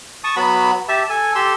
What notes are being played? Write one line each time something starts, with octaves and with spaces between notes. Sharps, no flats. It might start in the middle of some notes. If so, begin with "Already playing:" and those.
A5 C#6 D#6
F#3 B3 F#4 B5
G4 E5 A5
A4 G#5
G4 A4 C6 E6